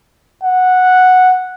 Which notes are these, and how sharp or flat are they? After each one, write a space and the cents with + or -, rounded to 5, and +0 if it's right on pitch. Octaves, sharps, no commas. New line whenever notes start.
F#5 -5